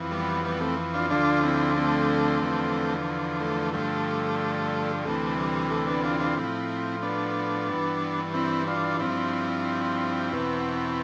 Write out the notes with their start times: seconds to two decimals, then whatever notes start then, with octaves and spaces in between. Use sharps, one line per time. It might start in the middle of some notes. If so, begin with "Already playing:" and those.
Already playing: F2 E3
0.11 G3 B3
0.44 G3 B3
0.60 A3 C4
0.94 D4 F4
1.10 D2 D3 F3 D4 F4
1.43 C4 E4
1.76 A3 C4
2.42 E2 D3 F3
3.40 A3
3.73 G2 D3 F3 A3
5.05 D2 C3 E3 A3
5.38 G3
5.70 A3
5.87 B3 D4
6.04 D4 F4
6.20 D4 F4
6.36 A2 F3 C4 E4
7.02 B3 D4
7.68 G2 E3
8.34 C4 E4
8.67 D4 F4
8.99 G2 F3 C4 E4
10.32 E2 B2